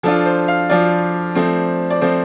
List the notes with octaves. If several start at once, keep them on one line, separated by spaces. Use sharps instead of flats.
F3 D4 F4 A4
C5
F5
F3 D4 F4 D5
F3 A3 C4
D5
F3 A3 C4 C5